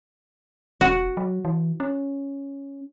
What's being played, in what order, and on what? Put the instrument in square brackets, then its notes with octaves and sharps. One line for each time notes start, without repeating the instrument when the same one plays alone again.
[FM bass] E1 [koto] F#4
[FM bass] F#3
E3
C#4